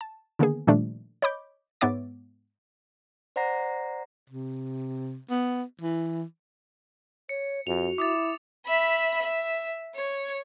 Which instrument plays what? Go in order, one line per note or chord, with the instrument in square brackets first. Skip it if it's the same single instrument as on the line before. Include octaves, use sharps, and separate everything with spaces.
[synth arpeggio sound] A5
D3 D#3 A#3 B3 G#4
A#2 D#3 F3 G3 A3 D4
C#5 D#5 B5 D6 G6
G#2 B3 C#5 E5 D6 A6
[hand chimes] C5 D5 F#5 A#5 A#6 C7
[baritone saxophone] C3
B3
E3
[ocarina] C#5 [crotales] C#7
[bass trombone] F2 [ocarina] F#4 [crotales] F7
[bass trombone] E4 [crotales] D6 D#6 A6
[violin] E5 B5
E5
C#5